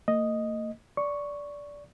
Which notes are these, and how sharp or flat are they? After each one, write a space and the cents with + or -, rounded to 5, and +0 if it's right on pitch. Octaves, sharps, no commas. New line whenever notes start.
A#3 -45 D#5 +0
D5 -15 C#6 +0